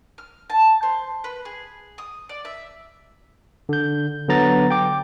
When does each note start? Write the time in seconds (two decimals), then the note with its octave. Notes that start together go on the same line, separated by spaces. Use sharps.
0.18 F6
0.50 A5
0.83 C5
1.24 B4
1.45 G#4
1.98 D#6
2.29 D5
2.45 E5
3.69 D3 G6
4.28 D3 F#3 B3 A#5 A6
4.70 G5 D6